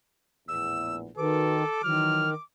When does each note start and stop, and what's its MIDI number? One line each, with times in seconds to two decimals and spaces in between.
0.48 1.08 34
0.48 1.08 40
0.48 1.08 45
0.48 0.96 88
1.17 1.64 51
1.17 1.57 66
1.17 1.81 69
1.17 1.57 71
1.17 2.43 86
1.84 2.34 51
1.84 2.27 52
1.84 2.27 54
1.84 2.30 89